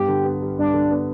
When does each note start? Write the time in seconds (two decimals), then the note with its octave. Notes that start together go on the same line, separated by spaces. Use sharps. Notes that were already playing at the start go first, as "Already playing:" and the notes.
Already playing: G2 B3 G4
0.08 D3
0.25 B3
0.42 G3
0.58 G2 D4
0.74 D3
0.91 B3